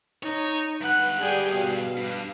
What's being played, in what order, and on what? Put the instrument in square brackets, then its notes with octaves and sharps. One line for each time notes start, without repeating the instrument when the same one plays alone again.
[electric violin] D#4 [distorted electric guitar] C#5
[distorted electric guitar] G2 F#5 [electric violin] B4 F#6
[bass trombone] G3 [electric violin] G#4 G5
[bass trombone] B2 [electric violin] F5
[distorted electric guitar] G2